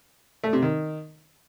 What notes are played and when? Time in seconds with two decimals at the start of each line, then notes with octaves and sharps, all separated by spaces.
0.44 A3
0.53 C3
0.62 D#3